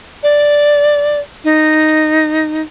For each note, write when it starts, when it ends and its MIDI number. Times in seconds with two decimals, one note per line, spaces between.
0.23 1.20 74
1.44 2.62 63